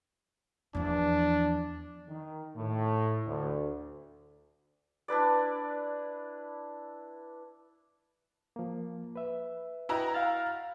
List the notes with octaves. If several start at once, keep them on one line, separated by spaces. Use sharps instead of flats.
E2 F3 D4
D#3
A2
D2
D4 E4 B4 D5
F3 A#3
B4 E5
E4 F#4 B4 D#5 G5 A#5
F5 F#5 F6 A6